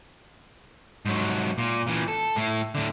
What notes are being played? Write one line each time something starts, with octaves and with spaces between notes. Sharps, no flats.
G#2 F#3
A#2
A#2 E3
A4
A2 A3
A2 D3